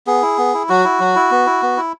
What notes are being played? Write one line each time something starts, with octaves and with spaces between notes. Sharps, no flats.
B3 G#4
E4
B3
E4
F#3 F#4
E4
F#3
E4
B3
E4
B3
E4